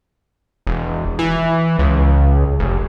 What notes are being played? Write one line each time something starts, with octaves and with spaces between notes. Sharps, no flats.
E1
E3
C#2
F1